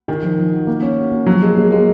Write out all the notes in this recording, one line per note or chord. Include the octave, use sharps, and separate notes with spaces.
D#3 D#4
F3
F3
F#4
A#3
C#4
F#4
A#3
F3 F#3
F3 G#3
G#3 A#3
G#3 A#3